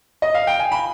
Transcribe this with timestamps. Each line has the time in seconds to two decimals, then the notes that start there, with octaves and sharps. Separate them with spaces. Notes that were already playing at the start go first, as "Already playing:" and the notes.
0.22 D#5
0.34 F5
0.47 G5
0.59 G#5
0.72 B5